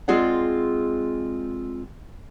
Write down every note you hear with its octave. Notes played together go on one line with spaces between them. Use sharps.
G#3 C4 F4 G#4 D5 F#5